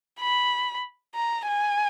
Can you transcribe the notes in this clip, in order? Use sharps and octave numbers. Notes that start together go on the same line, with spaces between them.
B5
A#5
G#5